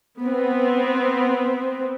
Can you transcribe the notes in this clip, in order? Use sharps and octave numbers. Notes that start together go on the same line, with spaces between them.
B3 C4